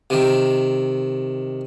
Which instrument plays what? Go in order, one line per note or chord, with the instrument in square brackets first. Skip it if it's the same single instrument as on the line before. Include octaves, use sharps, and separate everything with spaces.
[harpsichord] C3 D#3